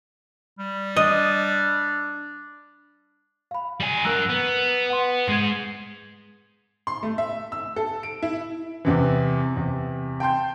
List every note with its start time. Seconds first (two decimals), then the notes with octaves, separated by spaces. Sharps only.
0.59 G3
0.96 D4 D#5
3.51 F5 B5
3.80 G3 G#5
4.04 F#3 A#4 A#5 E6 F#6
4.29 B3
4.90 F#5 C6
5.28 G#2 G#3 G#6 D#7
6.87 C6
7.03 A3
7.18 E5
7.52 E6
7.76 A4
8.03 D7
8.22 E4
8.85 E2 C3 E3
9.56 E2 C3
10.20 G5 A5 C6 G6